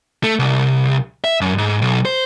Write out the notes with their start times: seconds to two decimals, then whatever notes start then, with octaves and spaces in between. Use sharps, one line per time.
0.24 A3
0.39 C2
1.24 E5
1.41 F#2
1.58 G#2
1.82 B1
2.05 C5